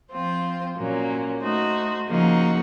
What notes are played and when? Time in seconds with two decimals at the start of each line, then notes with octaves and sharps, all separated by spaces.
0.12 F3 C4 F4 C5
0.77 A#2 F#3 A#3 C#4
1.42 A3 D#4 F#4 C5
2.07 C#3 F3 A#3 D#4 F#4